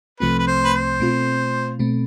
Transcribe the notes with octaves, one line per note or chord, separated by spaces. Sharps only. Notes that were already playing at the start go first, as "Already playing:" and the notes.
C2 C3 F3 A3 C4 B4
B4
C5
B4
C5
B2 A3 C4 F4
B2 A3 C4